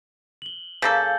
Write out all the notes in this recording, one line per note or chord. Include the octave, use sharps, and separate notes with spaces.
F#7 G7
C#3 A#3 A4 G#5 G6 A6